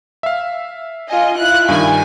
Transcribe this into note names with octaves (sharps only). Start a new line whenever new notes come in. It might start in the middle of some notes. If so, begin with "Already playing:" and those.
E5 F5
F4 D#5 G#5
E4 F4 F#6
G2 D#3 G#5